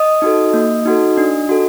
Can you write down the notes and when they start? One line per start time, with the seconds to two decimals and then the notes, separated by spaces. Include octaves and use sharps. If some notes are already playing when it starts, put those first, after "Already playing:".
Already playing: D#5 D#6
0.22 D#4 F#4 A4
0.53 A#3
0.85 D#4 F#4 A4
1.17 D4
1.49 F#4 A4